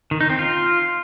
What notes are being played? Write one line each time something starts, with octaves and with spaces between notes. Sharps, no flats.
D#3
D#4
C4
F4